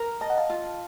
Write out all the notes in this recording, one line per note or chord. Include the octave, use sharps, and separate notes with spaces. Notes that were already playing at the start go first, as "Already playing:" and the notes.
Already playing: A#4
D#5 A5
F#5
F5 A5
F4